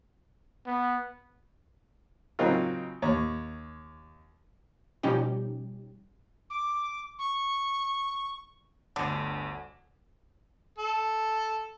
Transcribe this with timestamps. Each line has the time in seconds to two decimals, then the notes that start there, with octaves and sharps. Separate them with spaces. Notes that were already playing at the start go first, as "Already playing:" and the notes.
0.66 B3
2.39 C#3 F#3 A#3 C4 D#4 F4
3.02 D#2 C#5
5.03 B2 F3 G3 C#4 D#4 G4
6.50 D6
7.19 C#6
8.96 G1 D2 D3
10.78 A4